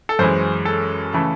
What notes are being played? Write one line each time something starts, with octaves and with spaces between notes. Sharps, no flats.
A4
F#2 E3 G#3 C5
A4
C#3 E3 A3